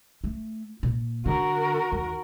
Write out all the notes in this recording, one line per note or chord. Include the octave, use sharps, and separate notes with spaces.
A3
A#2
D3 F#4 A#4
D#2